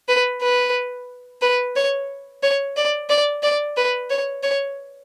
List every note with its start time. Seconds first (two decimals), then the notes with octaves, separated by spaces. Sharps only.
0.08 B4
0.42 B4
1.42 B4
1.76 C#5
2.43 C#5
2.77 D5
3.10 D5
3.43 D5
3.77 B4
4.10 C#5
4.43 C#5